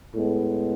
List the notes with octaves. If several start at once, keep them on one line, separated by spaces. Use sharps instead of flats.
A2 G#3 B3